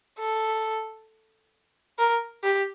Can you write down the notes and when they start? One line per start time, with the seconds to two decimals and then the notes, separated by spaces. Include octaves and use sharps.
0.19 A4
1.98 A#4
2.44 G4